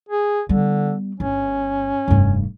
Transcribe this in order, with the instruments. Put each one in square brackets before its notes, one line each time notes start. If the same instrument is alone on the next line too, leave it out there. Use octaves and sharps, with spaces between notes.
[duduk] G#4
[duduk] D3 [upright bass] G3 B3
[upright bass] G1 [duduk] C#4
[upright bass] F1 G2